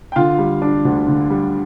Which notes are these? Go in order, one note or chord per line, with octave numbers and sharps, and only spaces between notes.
G5
D3 F4 F5
G3
D4
D2
D3
G3